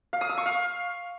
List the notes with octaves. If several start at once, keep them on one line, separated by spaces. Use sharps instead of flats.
F5
D#6
E6
C#6
F5